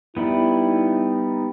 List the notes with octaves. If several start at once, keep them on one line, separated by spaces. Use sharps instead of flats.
G3 B3 D#4 E4